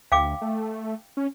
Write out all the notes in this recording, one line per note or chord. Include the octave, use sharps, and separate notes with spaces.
D2 F5 G5 D6
A3
C#4